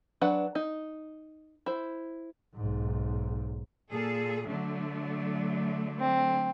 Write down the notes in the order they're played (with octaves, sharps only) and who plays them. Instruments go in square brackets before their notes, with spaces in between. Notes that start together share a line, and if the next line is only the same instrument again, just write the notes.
[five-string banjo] F#3 D4 B4 F#5
D#4
E4 C5
[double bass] B1 G#2
[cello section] A#2 G#4 A4
D3 F#3 A3
[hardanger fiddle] C4